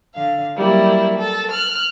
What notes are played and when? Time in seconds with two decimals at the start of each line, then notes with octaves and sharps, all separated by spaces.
0.14 D3 F5
0.57 F#3 G3 A#3 E4
1.18 A4
1.50 F6 F#6